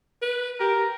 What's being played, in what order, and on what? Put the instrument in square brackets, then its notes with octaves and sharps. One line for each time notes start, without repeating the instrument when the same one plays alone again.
[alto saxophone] B4
[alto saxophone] G4 [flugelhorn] A#4